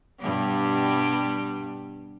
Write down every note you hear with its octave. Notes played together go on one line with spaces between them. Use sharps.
G2 B2 G3